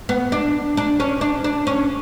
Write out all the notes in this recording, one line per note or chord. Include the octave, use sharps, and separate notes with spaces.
B3
D4
D4
C#4
D4
D4
C#4